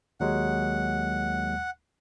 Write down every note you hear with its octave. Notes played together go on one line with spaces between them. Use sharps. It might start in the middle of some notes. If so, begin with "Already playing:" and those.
D#2 F#3 G#3 F#5